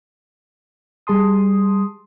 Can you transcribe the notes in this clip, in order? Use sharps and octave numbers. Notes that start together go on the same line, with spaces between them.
G3 G#4 A5 C6 D#6